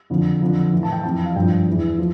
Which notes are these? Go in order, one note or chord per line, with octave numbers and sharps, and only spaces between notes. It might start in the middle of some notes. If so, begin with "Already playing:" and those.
F2 D3 F3
F2 D3 F3
A2 E3
A5
G5
F2 E3 A5
F5
G2 F3 G5
E2 E3
F3